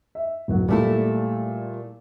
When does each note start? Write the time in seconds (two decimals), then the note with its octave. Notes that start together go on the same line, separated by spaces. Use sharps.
0.15 E5
0.48 D1 F#3 F#5
0.68 A#2 G3 A3 E4 A4